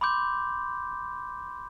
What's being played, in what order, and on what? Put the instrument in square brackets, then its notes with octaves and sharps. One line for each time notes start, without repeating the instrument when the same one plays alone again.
[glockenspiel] B5 C6 D6 G6